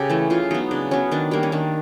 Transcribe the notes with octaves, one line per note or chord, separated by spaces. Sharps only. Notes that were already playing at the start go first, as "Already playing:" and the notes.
Already playing: C#3 G4 A4
E3 A3
C#3 F4
F#3 B3 D#4
C#3 D4
F#3 B3 C#4
D#3 D4
G3 A#3
C#4
D#3 D4